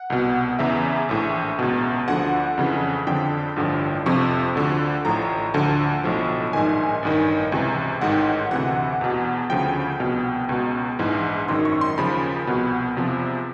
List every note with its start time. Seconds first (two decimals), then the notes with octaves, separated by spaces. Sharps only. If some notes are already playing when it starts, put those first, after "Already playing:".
Already playing: F#5
0.10 C2 B2
0.59 E2 C#3 E3 E5
1.09 A#1 A2 E3
1.59 C#2 B2
2.08 D2 D3 F3 F#5
2.58 F2 C#3 E3
3.07 F2 D3 F3 G5
3.56 A1 G2 D3 F3
4.06 F2 C3 F3 C#6
4.55 D2 D3 F3
5.05 A1 A2 F3 A#5
5.54 D2 D3 F3 A5
6.04 B1 A2 F3
6.53 A#1 G#2 D#3 G#5
7.03 A1 G2 D#3
7.52 C#2 C3 E3
8.01 A1 G#2 D#3 F#5
8.12 G5
8.21 F#5
8.51 D2 C3 E3 F#5
9.01 E2 B2
9.50 D2 C#3 F3 G5
10.00 C2 B2
10.49 C#2 B2
10.99 A#1 G#2 E3
11.48 G#1 F#2 D#3 C6
11.65 C#6
11.81 C6
11.97 D#2 C#3 F3 B5
12.47 C2 B2
12.96 E2 C3 F3